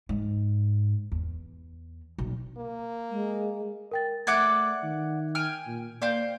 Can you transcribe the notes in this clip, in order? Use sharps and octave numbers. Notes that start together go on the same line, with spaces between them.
G#2
E2
B1
A#3
G#3
A#4 G5 A6
A3 D5 E5 F#5 D6 F#6 G#6
D#3
G5 G#5 F6
A#2
A#3 C5 D5 F5 G5